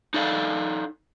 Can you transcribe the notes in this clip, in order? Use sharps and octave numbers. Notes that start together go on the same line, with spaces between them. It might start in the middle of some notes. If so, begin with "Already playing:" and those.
D#4 A4 D5 F5